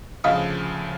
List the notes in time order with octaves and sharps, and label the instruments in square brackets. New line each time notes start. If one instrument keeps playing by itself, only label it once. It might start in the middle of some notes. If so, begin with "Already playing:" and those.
[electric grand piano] D2 C#3 F3 [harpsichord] D#5 F5 B5